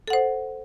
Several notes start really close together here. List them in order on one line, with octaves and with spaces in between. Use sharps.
A4 F#5 C5